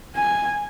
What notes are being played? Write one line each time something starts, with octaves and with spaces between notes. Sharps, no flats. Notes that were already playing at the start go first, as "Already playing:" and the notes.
G#5